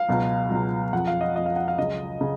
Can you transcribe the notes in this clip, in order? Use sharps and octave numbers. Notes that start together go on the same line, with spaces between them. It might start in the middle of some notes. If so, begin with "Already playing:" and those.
Already playing: F5
C#2 B2 F#3
C#2 B2 F#3
F2 F3 F#5
F5
D#5
F2 F3 D#5
F5
F#5
F5
C#2 C#3 F#3 D#5
C#3